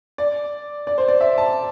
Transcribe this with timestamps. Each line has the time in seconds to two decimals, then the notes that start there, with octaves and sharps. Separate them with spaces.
0.18 D5
0.87 D5
0.98 C5
1.08 D5
1.21 E5
1.38 A5